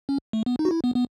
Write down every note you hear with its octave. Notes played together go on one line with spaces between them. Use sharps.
C#4
A3
B3
D#4
F#4
E4
B3
B3